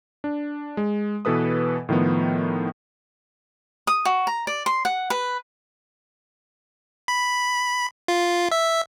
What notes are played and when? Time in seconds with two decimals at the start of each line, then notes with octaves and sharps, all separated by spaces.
0.24 D4
0.77 G#3
1.25 B2 E3 A4 B4 D#6
1.89 A2 D#3 F3 B3
3.87 D#6
4.05 F#4
4.27 A#5
4.47 D5
4.66 C6
4.85 F#5
5.10 B4
7.08 B5
8.08 F4
8.51 E5